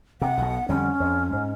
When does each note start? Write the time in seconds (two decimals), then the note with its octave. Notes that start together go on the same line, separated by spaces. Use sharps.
0.21 C3 F#5
0.37 B1 B2
0.69 F2 D3 G3 C#4
1.00 F2
1.33 G#2